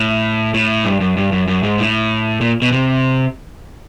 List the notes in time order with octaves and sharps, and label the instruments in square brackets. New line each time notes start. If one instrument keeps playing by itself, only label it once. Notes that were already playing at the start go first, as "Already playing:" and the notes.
Already playing: [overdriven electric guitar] A2
A2
G2
F#2
G2
F#2
F#2
G#2
A2
A#2
B2
C3